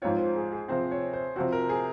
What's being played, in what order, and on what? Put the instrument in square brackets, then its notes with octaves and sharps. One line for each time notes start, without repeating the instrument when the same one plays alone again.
[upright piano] G#2 F3 C4 F4 [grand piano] C#5
[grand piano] C5
G#4
G#4
[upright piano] C3 F3 C4 [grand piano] C5
[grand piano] C#5
C5
[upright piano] C3 F3 C4 [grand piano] F#4
[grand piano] A#4
G#4